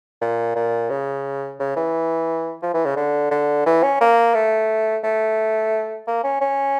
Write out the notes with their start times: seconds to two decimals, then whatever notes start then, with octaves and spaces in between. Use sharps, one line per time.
0.21 A#2
0.56 A#2
0.90 C#3
1.59 C#3
1.76 E3
2.63 F3
2.74 E3
2.85 C#3
2.96 D3
3.31 D3
3.66 E3
3.83 C#4
4.01 A#3
4.35 A3
5.03 A3
6.07 A#3
6.24 C#4
6.41 C#4